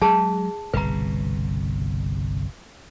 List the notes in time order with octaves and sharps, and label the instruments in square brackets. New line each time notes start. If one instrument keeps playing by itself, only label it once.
[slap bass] F#3 G#3 [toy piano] G#4 A5
[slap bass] G1 C2 B2 [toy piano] B4 A#5